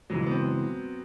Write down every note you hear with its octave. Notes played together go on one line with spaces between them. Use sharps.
C#3 E3 F#3 G#3
B3
C4